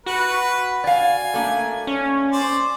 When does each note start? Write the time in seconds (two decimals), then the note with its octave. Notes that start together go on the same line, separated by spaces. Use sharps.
0.06 F#4 B4
0.84 D5 F5 G#5
1.34 A3 A#3 D4
1.87 C#4
2.32 C5 D5